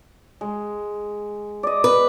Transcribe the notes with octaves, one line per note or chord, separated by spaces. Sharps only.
G#3
D5 D#5
B4